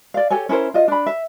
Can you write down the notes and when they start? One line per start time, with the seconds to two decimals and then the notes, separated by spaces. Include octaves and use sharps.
0.14 D5 F5
0.30 G4 A4 C#5 G#5
0.49 C#4 E4 A#4 C5
0.74 F4 D#5
0.88 D4 B5
1.06 E5